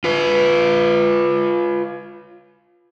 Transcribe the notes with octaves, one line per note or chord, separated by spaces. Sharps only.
F4 B4